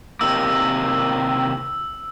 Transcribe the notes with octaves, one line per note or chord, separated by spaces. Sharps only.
C3 D#3 A#3 E6